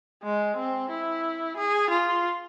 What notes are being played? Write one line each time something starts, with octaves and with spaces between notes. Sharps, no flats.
G#3
C4
E4
G#4
F4